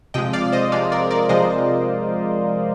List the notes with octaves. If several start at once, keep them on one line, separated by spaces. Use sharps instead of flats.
C3 F3 G#3 D#5 G5
D5 F5
C5 D#5
C3 F3 G#3 D5 F5
A#4 D5
A#4 D5
C3 F3 G#3 C5 D#5